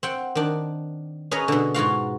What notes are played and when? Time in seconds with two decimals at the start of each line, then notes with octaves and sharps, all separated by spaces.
0.03 C4 F#5 G5
0.35 D#3 D4
1.31 C#4 G#4 B4 C#5 D#5 A#5
1.48 B2 D3
1.74 G#2 F4 F#4 F5